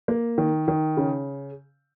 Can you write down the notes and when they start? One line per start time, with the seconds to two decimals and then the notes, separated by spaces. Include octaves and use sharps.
0.08 A#3
0.38 D#3
0.68 D#3
0.97 C#3